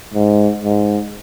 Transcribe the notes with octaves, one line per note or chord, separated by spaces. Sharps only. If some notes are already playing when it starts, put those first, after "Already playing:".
G#2
G#2